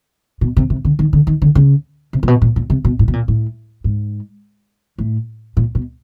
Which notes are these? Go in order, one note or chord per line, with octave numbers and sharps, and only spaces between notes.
B2
C3
C3
D3
D#3
D3
D#3
D3
C#3
C3
A#2
B2
A#2
A#2
C3
B2
A2
B2
A#2
A2
G#2
A2
A#2
B2